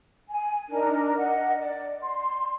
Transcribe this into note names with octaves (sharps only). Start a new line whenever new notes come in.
G#5
D4 D#4 A#4
D#5 F#5
D5
C6